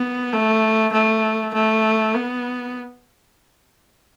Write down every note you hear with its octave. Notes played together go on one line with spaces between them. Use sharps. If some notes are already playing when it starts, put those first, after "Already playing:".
Already playing: B3
A3
A3
A3
B3